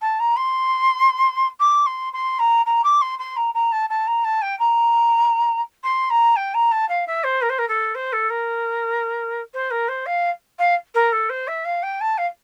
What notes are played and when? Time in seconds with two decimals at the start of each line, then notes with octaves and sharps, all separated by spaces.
0.01 A5
0.19 A#5
0.36 C6
1.59 D6
1.86 C6
2.13 C6
2.39 A#5
2.66 A#5
2.84 D6
3.01 C6
3.19 C6
3.36 A#5
3.54 A#5
3.72 A5
3.89 A5
4.07 A#5
4.24 A5
4.42 G5
4.59 A#5
5.83 C6
6.10 A#5
6.36 G5
6.54 A#5
6.71 A5
6.88 F5
7.07 E5
7.23 C5
7.41 A#4
7.49 C5
7.58 A#4
7.68 A4
7.95 C5
8.12 A4
8.30 A#4
9.54 C5
9.70 A#4
9.88 C5
10.06 F5
10.58 F5
10.94 A#4
11.12 A4
11.29 C5
11.47 E5
11.65 F5
11.82 G5
12.00 A5
12.17 F5